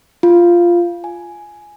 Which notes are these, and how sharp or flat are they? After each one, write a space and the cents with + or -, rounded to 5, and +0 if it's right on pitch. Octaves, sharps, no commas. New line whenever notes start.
F4 -10
G#5 +5